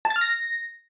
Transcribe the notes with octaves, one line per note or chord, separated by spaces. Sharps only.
A5
A6
F6
A#6